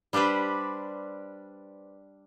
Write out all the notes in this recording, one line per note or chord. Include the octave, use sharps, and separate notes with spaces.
G3 D4 G4 B4 C5